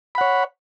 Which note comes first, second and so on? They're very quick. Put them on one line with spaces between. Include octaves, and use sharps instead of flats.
B5 F#5 C#5